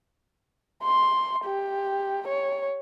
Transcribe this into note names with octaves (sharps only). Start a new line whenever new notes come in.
C6
G4
C#5